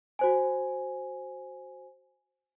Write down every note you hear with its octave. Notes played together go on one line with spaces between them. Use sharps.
F#4 C5 G#5